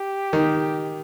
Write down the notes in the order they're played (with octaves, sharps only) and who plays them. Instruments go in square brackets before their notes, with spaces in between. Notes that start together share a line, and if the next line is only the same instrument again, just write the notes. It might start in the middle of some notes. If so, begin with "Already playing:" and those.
Already playing: [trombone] G4
[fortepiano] D#3